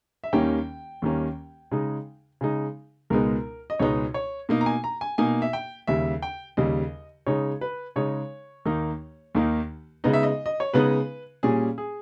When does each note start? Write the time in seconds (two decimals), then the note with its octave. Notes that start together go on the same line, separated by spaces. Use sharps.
0.24 E5
0.33 D#2 D#3 G3 A#3 C#4 G5
1.02 D#2 D#3 G3 A#3 C#4
1.71 C#3 G#3 D#4
2.41 C#3 G#3 D#4
3.10 C#2 B2 G#3 B3 D#4 A#4
3.70 D#5
3.79 C#2 B2 G#3 B3 D#4 C#5
4.14 C#5
4.49 B2 A#3 D#4
4.61 A#5
4.66 G#5
4.84 A#5
5.01 G#5
5.18 B2 A#3 D#4 G#5
5.42 E5
5.53 G5
5.87 D#2 C#3 G3 E5
6.22 G5
6.57 D#2 C#3 G3 D#5
7.27 C#3 G#3 D#4 C#5
7.61 B4
7.96 C#3 G#3 D#4 C#5
8.65 D#2 D#3 A#3 D#4
9.35 D#2 D#3 A#3 D#4
10.04 C#3 G#3 B3 D#4 D#5
10.13 E5
10.23 D#5
10.46 D#5
10.60 C#5
10.74 C#3 G#3 B3 D#4 B4
11.43 A#2 G3 C#4 G#4
11.78 G#4